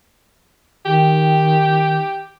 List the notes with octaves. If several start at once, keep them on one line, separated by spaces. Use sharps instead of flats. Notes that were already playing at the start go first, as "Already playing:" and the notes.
D#3 G4